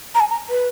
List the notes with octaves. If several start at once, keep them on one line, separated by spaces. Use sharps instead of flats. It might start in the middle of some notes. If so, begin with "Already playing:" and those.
A#5
G#5
A#5
B4